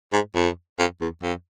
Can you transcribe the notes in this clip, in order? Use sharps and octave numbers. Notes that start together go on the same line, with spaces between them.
G#2
F2
F2
E2
F2